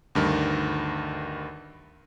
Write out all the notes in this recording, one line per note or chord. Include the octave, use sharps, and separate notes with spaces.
D2 G2 D#3